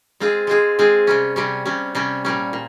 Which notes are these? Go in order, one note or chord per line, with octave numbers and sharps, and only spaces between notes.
G#3 C4 F4 G#4
G#3 C4 F4 G#4
G#3 C4 F4 G#4
C3 G3 C#4
C3 G3 C#4
C3 G3 C#4
C3 G3 C#4
A#2 G3 C#4
A#2